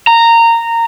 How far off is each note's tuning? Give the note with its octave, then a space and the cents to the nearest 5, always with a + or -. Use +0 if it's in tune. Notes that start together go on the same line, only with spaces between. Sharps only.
A#5 -15